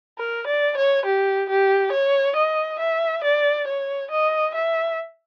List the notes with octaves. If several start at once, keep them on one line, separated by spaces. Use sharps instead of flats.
A#4
D5
C#5
G4
G4
C#5
D#5
E5
D5
C#5
D#5
E5